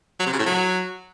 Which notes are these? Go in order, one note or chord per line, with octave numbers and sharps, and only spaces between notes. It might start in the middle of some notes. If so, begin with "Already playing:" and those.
F#3
C3
C#3
A2
F#3